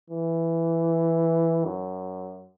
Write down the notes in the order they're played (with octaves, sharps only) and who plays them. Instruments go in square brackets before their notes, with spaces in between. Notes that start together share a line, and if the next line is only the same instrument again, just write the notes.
[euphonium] E3
F#2